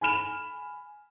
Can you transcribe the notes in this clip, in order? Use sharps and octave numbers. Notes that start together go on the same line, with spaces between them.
G#5 B5 F6 E7